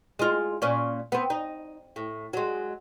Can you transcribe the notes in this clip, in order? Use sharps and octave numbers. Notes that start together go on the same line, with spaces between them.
G#3 F4
A#2 C#4
B3 C4
D#4
A2
F#3 G#3